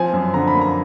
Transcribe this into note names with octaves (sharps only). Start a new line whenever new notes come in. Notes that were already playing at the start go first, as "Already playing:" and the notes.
Already playing: F3 C4 G#5
F#2
D3 A#5
B5
A#3
A#5